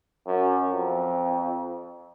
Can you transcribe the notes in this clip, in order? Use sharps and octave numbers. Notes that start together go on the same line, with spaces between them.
F#2
F2